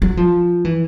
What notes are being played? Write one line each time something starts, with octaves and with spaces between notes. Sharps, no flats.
F#3
F3
E3